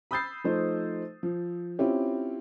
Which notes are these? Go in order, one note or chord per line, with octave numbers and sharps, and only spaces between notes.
B5 D#6 E6 G6 A6 C7
F3 A3 D#4 C5
F3
C4 C#4 E4 F4 G4 C#5